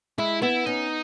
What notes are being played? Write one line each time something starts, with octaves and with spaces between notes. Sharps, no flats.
G#3 E4
B3 E4
C#4 D#4